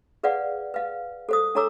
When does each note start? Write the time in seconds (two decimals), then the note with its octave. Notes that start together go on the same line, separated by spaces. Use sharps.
0.23 G#4 B4 D5 F5 F#5
0.74 B4 F5
1.29 A4 C5 D#6
1.55 D4 A4 C#5 A#5 D6 E6